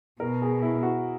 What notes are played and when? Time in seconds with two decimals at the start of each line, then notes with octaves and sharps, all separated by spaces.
0.20 B2 A#4
0.42 G#4
0.62 E4
0.83 F#4